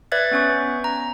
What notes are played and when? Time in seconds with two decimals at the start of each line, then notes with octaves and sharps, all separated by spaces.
0.12 B4 D5 E5 F#6 G#6 A6
0.31 B3 C#4 C#6
0.84 A#5